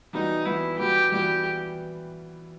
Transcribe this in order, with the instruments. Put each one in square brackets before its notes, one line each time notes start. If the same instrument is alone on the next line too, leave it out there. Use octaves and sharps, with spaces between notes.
[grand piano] E3 G3 B3 F#4 [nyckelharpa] D#4
[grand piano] E3 G3 B3 F#4 [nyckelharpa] E4
[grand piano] E3 G3 B3 F#4 [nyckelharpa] G4
[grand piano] E3 G3 B3 F#4 [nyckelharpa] G4